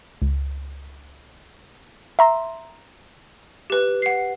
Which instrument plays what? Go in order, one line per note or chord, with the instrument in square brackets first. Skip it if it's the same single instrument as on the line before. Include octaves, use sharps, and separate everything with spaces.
[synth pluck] C#2
E5 A#5 C6
[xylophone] G4 B4
F#5 C7